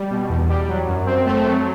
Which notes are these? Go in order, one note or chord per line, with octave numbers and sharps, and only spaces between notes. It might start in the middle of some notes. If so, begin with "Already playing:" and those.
Already playing: G3
B2
E2
G3
F#3
F#2
C4
A3
F#3